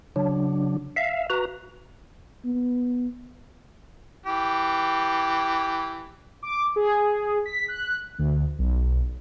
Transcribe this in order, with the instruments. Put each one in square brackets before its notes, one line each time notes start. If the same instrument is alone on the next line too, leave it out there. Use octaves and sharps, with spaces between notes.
[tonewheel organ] C#3 F#3 D4
E5 F5
F#4 B4 A#5
[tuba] B3
[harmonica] E3 G4
[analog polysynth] D6
G#4
B6
F#6
D2
B1